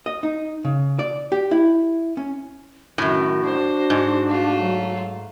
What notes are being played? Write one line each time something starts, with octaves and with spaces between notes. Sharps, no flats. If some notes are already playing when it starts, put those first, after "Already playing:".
D#5
D#4
C#3
D5
G4
E4
C#4
F#2 A2 D#3 F#4
D4 C5
G#2
A3 F4
F#3